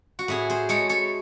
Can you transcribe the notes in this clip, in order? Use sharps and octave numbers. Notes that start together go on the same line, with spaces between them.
F#4
A2 E4 G#4
G#4 C5
G#3 A4 C#5
A4 C#5